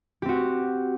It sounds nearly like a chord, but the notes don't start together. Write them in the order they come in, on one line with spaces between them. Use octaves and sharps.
G4 C4 F#4